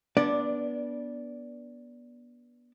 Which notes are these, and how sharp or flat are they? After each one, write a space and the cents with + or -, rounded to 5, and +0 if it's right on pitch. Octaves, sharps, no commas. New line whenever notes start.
B3 -25 D4 -15 D5 +5